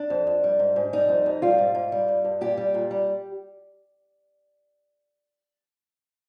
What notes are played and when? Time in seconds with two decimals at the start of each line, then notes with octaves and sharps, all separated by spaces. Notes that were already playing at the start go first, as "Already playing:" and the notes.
Already playing: D4
0.10 F2
0.27 F2
0.44 G3
0.59 G#2
0.76 G#2
0.93 G3 D#4
1.09 F2
1.26 F2
1.42 G3 F4
1.58 G#2
1.75 G#2
1.92 G3
2.08 G2
2.24 G2
2.41 A#2 G4
2.57 G3
2.74 A#2
2.91 G3